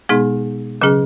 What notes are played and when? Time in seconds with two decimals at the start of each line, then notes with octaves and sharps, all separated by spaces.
0.09 B2 G#3 B3 D#4 G#4
0.81 C#3 F#3 C#4 G#4